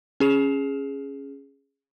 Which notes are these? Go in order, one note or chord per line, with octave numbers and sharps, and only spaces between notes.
C#4 G#4 E7 F7